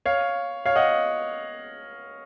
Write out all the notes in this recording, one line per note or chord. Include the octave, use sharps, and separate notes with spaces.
C#5 F5
C#5 F5
D#5 F#5